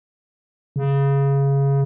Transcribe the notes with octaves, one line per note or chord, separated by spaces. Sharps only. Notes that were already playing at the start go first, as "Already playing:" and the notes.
C#3